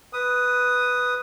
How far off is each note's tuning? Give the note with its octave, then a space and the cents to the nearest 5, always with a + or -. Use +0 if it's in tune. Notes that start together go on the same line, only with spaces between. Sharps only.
B4 +0 D#6 +0